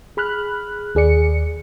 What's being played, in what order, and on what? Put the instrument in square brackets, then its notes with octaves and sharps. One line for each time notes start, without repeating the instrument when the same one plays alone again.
[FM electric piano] G#4 B5 F6 F#6
D#2 G#4 D5 C#7